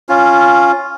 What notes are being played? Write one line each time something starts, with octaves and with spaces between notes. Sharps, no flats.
C#4 F4